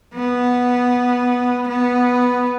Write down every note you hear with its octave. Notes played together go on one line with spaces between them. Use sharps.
B3
B3